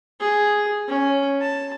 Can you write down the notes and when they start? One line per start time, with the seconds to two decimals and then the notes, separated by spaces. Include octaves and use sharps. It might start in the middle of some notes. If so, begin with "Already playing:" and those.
0.20 G#4
0.88 C#4
1.41 A5